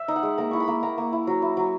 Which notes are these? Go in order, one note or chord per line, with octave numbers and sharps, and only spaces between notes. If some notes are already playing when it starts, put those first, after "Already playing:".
Already playing: E5
D#4
F#5
G#3
A#3 A#5
E4 C#6
B5
A#3
A#3 A#5
A#3
E4
F#3
E4
F#3